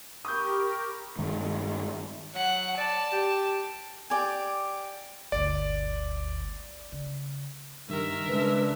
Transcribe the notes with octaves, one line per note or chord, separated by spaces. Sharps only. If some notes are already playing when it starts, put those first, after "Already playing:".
G4 A#4 B5 C#6 D#6 G6
G2 D#3 G#3
F#3 F#5
D5 A5
G4
G4 D5 G#5
G1 D2 D5
C#3
G2 D#3 A#4 E5
C#3 G#3 D4 B4